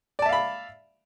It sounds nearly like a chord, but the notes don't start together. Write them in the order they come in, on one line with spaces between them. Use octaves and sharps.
D5 A5 E5 F5 B5